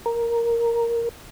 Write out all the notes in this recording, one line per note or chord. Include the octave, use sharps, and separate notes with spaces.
A#4